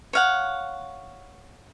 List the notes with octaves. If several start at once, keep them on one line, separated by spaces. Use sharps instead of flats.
C#5 F5 F#5